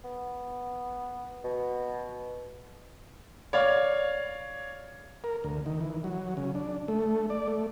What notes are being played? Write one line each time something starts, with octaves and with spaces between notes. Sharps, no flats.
B3
B2
C#5 D5 F5
A#4
D2
D#3
E3
F#3
C#3
D4
A3
D5
A3